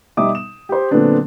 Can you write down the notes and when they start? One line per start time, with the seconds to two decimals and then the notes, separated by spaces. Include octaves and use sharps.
0.17 B2 G3 D#4 E5 D6 D#6
0.35 E7
0.69 G4 C5
0.91 A#2 D3 F#3 B3 C4 D4